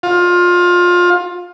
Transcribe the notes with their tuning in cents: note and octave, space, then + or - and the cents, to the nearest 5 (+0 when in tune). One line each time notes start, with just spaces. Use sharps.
F4 +20